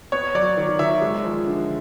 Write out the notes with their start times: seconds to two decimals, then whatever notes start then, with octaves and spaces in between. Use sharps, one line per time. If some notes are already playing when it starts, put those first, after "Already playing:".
0.12 B3 C#5
0.35 F#3 D5
0.57 D#3
0.79 D#3 E5
1.02 G#3
1.24 F3
1.47 D3